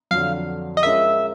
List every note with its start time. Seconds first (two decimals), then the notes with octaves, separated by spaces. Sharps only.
0.11 F2 D3 F#3 F5
0.77 D#5
0.83 G#3 C#4 F4 A#4 E5